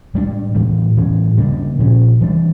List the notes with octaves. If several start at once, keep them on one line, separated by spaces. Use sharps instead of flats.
A2 G3 A#3 D4
A2 E3 G3
A2 E3 G3 C#4
C#3 G3 A#3 D4
A#2 F3 C#4
E3 G3 D4